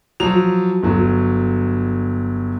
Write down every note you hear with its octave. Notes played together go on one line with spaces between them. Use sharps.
F3 F#3 F7
G1 F#3